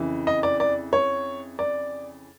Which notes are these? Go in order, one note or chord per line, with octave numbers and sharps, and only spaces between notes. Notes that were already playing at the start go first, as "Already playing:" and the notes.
Already playing: F2 C#3 E3
D#5
D5
D5
C#5
D5